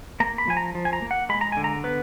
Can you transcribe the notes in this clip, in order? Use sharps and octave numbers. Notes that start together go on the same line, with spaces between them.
A#3 A#5
B5
F3 G#5
A#5
F3
G#5
A#5
A#3
F#5
G#3 B5
A#5
D3 G#5
A#5
B3 B4